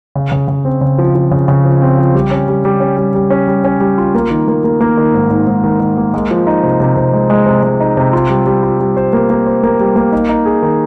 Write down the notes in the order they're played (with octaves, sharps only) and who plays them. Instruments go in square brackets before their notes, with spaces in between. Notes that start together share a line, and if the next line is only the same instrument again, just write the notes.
[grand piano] C#3
C#3
C#3
C4
C#3
F3
F3
C#3
C#3
F3
C4
F3
G3
C#4
G3
G3
C#4
G3
G3
C#4
G3
C#4
G3
F4
A#3
D#3
A#3
A#3
A#3
D#3
G#2
G#2
G#2
D#3
D#3
A#3
G#3
F3
D#4
C3
C3
C3
G#3
G#3
C3
G#3
D#4
C3
F4
G3
G3
F4
G3
C5
A#3
A#3
C5
A#3
G3
A#3
D#4
D#4
G#4
D#3